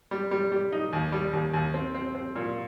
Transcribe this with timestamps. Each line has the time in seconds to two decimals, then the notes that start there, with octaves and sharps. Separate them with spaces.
0.11 G3
0.31 G3
0.52 G3
0.72 D#4
0.93 D#2
1.12 G3
1.33 D#2
1.54 D#2
1.74 C4
1.94 C4
2.15 C4
2.36 A#2